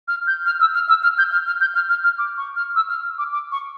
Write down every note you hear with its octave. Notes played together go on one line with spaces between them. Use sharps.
F6
G6
F6
E6
F6
E6
F6
G6
F6
F6
G6
F6
F6
F6
D6
C#6
F6
E6
F6
D6
D6
C#6